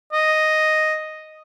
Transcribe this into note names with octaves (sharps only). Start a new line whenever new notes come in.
D#5